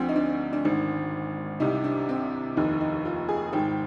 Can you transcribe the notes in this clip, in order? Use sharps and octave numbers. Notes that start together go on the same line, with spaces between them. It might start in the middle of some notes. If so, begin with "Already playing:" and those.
Already playing: D2 D3 F3 C4 D4
D#4
D4
D4
G#1 G#2 D#3
C2 C3 D#3 D#4
D4
C4
F1 D#2 D#3 D#4
D#4
F4
G#4
G#1 G#2 D#3 G5